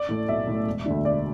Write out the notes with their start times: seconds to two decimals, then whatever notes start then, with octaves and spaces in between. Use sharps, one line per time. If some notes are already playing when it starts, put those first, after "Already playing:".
Already playing: D5
0.09 A2 A3
0.29 B1 E5
0.48 A2 A3
0.66 E1
0.86 D2 D3
1.05 E1 D5